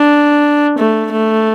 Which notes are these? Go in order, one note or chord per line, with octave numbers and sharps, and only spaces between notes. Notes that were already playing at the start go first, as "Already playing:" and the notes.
Already playing: D4
A3
A3